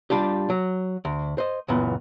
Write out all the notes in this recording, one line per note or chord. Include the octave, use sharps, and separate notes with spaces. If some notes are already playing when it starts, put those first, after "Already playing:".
G3 D4 F4 G4
F#3
D2
C5 D#5
C#2 F#2 A#2 E3 B3